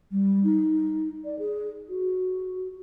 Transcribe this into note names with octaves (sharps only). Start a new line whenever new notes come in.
G3
D#4
D5
G#4
F#4